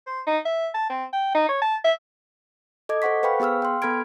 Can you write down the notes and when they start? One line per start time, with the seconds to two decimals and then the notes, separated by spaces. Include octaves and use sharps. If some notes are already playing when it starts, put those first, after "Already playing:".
0.07 C5
0.27 D#4
0.45 E5
0.74 A5
0.90 C4
1.13 G5
1.34 D#4
1.49 C#5
1.62 A5
1.84 E5
2.89 A4 D#5 D6 G#6
3.02 A4 C5 F#5 C#6 B6
3.23 B4 C5 F5 G5 B5 C#6
3.40 B3 G#4 F5 E6 F6
3.62 G5 C6
3.82 B3 A4 B5 F6 G#6 D7